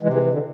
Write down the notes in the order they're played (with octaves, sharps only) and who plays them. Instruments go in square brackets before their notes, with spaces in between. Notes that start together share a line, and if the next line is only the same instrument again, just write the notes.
[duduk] C3 [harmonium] E3 G#3
[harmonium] E3 G#3
E3
D3